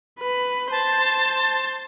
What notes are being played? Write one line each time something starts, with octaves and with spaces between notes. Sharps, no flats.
B4
C5 A5